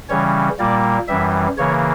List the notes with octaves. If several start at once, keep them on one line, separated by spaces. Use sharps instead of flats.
C#3 E3 G3 C#4 C#5
A#2 G3 A#3 D5
F#2 E3 G3 E5
C#3 E3 A#3 C#5